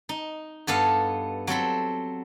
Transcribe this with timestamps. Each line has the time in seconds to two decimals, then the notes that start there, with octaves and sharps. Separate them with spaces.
0.09 D#4
0.67 G2 B3 A4 F5
1.47 F#3 C4 A4 B5